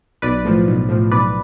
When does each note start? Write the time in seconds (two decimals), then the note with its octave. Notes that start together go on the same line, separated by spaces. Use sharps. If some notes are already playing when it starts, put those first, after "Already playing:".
0.22 B1 B4 D5
0.45 A2 F3
0.67 B1
0.89 A2 F3
1.11 B1 B4 D5